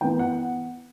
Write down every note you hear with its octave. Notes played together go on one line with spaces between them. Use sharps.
E3 B3 G5
F#5